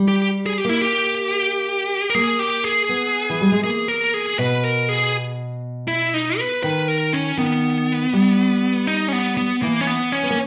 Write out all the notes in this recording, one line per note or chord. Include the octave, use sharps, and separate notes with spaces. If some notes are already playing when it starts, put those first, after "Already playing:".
Already playing: G3
G4
G#4
G4
A#3 E4
G4
A#4
A#3 G#4
G4
G#4
B3
E3
G3
G#3
A#3 G#4
A#4
G#4
B2 B4
A#4
G#4
E4
D#4
B4
D#3 B4
A#4
C#4
D#3 B3
G3
D#4
C#4
B3
B3
E3 A#3
C#4
B3
C#4
B3
A#3